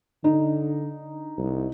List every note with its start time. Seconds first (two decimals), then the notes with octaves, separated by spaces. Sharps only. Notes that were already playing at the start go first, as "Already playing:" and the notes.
0.24 D3 D#4
1.38 C2